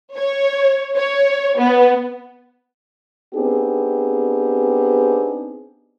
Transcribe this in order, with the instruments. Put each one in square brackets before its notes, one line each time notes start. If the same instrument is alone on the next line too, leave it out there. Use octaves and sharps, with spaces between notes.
[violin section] C#5
C#5
B3
[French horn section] B3 C4 D4 D#4 G4 G#4